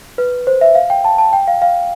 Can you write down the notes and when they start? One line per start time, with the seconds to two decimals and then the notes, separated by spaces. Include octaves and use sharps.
0.18 B4
0.47 C5
0.61 E5
0.75 F5
0.90 G5
1.04 A5
1.18 A5
1.33 G5
1.48 F5
1.62 F5